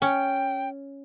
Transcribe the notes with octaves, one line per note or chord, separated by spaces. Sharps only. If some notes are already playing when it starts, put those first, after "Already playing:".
C#4 G5